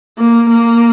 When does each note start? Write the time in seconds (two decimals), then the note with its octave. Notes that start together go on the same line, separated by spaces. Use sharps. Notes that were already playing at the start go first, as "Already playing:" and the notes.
0.18 A#3
0.49 A#3